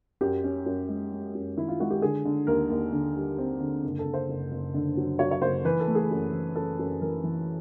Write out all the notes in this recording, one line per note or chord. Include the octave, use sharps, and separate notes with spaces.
F#2 G4
C#4
F#2
G#3
G#3
F#2
D#3 E4
F4
G#3 F#4
G4
D3 G#4
D3
D#2 A#4
D#2
D3
G3
C4
D3
F#1
A4
F#1
C5
F#1
F#1
D3
F#3
F#3 C#5
C#5
F#1 C5
E3 B4
A4
A3
G#4
F#2
E3
F#2 A4
F#2
E3 A#4
E3